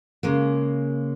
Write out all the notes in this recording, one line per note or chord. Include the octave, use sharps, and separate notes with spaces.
C#3 G#3 A#3